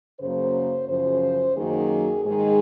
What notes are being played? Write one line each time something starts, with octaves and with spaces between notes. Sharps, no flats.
F#2 C#3 F#3 A#3 C5
F#2 C#3 F3 C5
F#2 D#3 F#3 A#3 G#4
G#2 D#3 G#3 G#4